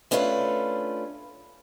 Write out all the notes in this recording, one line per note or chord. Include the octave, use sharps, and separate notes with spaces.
A3 C#4 D4 F4 B4